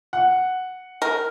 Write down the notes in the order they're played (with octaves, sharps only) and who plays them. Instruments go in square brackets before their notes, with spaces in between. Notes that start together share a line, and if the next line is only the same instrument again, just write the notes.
[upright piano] F#5
[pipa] A#4